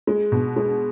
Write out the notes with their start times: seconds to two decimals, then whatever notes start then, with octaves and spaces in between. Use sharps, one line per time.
0.07 G#3
0.32 B2
0.56 G#3